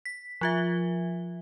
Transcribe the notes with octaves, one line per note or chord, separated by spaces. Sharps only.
B6
F3 F4 E5